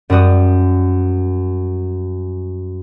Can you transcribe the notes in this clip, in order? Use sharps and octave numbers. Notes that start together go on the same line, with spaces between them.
F#2 G3 F#4 D#6